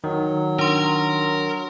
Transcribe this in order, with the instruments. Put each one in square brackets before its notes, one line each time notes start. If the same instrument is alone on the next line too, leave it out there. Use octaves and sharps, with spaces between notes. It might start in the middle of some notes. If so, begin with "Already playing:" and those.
[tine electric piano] D#3 [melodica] F#3
[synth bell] D4 C6 [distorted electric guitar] A#4